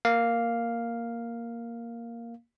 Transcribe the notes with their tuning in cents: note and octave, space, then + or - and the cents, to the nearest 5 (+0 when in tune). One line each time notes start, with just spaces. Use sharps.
A#3 +0 F5 +0